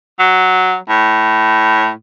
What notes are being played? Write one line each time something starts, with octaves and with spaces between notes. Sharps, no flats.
F#3
A2